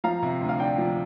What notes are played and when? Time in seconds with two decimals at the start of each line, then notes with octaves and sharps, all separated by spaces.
0.04 F3 F5 A#5
0.23 C3
0.41 D2
0.49 F5
0.59 D4 G5
0.78 F3